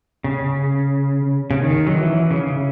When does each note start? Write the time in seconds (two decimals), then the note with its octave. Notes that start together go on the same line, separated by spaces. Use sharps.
0.24 C#3
1.51 C#3
1.62 D#3
1.87 F#3
1.97 E3
2.31 C#3